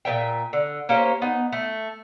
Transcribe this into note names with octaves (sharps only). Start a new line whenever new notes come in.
A#2 A3 E5 G5
D3
A#3 C#4 G4 C5
B3 D#4
A3